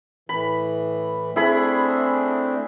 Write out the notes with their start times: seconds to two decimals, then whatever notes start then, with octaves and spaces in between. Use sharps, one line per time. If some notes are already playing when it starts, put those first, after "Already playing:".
0.29 A2 E3 B5
1.36 A3 C4 D4 E4 G#4 B5